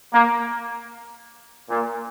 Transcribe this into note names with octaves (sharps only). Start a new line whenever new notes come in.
A#3
A#2